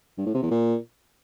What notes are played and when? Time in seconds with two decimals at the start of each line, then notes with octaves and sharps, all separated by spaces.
0.18 G2
0.26 A2
0.34 C3
0.43 E2
0.51 A#2